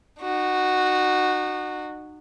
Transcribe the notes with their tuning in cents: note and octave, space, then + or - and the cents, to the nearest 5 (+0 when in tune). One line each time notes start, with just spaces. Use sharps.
D#4 -35 F#4 +0